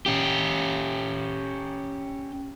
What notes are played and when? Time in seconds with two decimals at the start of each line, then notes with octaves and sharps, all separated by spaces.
0.06 C#4 G4